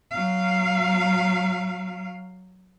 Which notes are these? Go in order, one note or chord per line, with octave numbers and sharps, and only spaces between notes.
F#3 F5